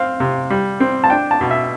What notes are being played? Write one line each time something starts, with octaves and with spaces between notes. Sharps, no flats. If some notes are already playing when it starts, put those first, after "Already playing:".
Already playing: C4 F5
C3
G3
C4
A5
D4 G5
A5
B2
E5